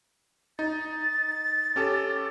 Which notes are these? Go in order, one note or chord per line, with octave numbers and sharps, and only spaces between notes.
D#4 A6
C#4 G4 A4